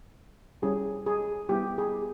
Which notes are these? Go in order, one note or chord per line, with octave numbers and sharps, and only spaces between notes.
G3 C#4 E4 G4 G#4
G#4
G3 B3 E4 G4
G#4